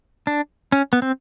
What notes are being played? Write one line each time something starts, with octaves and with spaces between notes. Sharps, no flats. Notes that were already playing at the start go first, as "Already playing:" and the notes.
D4
C#4
B3
C4